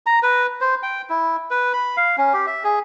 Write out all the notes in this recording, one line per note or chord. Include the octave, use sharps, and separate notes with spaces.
A#5
B4
C5
G5
E4
B4
B5
F5
C#4
G4
E5
G#4